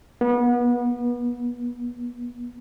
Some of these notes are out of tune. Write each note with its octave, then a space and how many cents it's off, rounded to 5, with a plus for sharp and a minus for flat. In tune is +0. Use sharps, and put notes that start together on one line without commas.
B3 -30